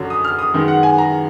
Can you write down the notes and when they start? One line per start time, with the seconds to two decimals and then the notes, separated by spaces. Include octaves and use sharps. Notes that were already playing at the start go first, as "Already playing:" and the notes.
Already playing: F#2 D3 F#3
0.10 D#6
0.24 F6
0.39 D#6
0.53 F#2 D#3 G#3 B3
0.68 F#5
0.83 G#5
0.98 A#5